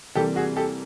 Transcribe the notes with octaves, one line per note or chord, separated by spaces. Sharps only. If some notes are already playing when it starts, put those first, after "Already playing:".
C3 E3 G3 A#3 G4 A4
F#4 G#4
G4 A4